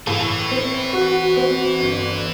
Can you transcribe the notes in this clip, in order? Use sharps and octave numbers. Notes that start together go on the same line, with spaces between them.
A2 E3
C4
F#4
C4
G1